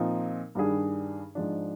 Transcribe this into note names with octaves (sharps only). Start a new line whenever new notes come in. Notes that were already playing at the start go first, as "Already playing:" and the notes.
Already playing: A#2 F3 C4 D#4
G2 D#3 G3 D4 G#4
G#2 F3 G#3 D4